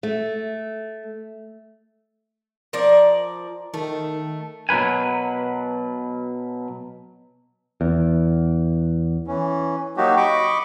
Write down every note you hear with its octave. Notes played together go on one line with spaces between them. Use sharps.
A3
F3 A#4 D5
D#3 A3
B2 F#3 A#4 B4 G#5
E2
E3 C#4
F#3 A#3 D#4 F#4 G4
D#5 B5 C#6 D6